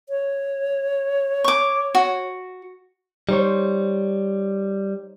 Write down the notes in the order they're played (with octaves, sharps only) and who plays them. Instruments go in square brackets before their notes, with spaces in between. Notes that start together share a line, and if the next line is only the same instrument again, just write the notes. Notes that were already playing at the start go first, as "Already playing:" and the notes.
[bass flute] C#5
[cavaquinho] C#6 D6
F#4
[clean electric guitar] G3 [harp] D#4 C5 C#5